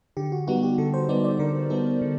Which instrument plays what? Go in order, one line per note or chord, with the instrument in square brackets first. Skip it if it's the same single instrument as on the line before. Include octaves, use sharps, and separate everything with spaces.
[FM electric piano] D3 G4
F#4
G3 B3 D#4 F#4
G4
D3 A4
C5
G3 B3 D#4 D5
D5
D3 A#4
G3 B3 D#4 A4
D3